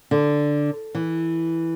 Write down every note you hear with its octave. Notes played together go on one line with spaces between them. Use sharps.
D3
E3